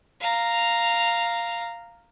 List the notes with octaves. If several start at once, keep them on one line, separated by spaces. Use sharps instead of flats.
F5 A#5